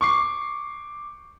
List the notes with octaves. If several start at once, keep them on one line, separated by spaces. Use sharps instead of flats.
C#6 D6 C7